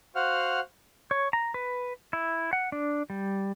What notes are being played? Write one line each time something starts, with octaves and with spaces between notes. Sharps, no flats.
F#4 C5 F5 F#5 F6
C#5
A#5
B4
E4
F#5
D4
G3